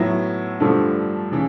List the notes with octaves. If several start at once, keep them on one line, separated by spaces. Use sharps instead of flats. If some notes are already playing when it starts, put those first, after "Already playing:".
Already playing: A2 F#3 B3 E4
G2 D3 F3 A3
C#3 E3